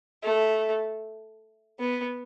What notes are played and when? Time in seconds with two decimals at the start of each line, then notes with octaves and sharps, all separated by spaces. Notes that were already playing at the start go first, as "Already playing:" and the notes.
0.23 A3
1.80 B3